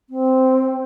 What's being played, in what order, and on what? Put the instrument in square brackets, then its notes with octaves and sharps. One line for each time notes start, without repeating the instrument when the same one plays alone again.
[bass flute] C4